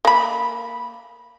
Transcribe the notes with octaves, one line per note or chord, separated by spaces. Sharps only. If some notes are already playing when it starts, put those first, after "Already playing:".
A#3 B5